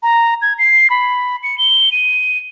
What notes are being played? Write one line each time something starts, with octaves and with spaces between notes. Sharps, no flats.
A#5
G#6
C7
B5
C#7
G7
D#7